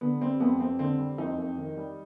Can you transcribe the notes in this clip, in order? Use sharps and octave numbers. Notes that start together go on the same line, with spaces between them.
D3 B3
G3 C4
F2 B3
F2 C4
D3 C4
G3
F2 D#4
F2
D#3
G3